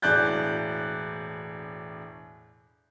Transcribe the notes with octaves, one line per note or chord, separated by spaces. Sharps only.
E1 A2 D5 F#6 G6